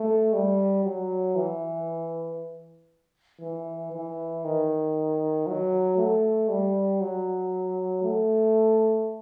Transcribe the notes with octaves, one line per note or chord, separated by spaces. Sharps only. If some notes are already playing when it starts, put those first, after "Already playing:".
Already playing: A3
G3
F#3
E3
E3
E3
D#3
F#3
A3
G3
F#3
A3